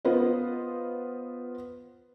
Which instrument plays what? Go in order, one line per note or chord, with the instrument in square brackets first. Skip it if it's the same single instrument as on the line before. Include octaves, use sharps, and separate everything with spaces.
[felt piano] B3 F4 B4 C5 D#5